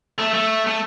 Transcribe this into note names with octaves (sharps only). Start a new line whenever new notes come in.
A3
A3
A3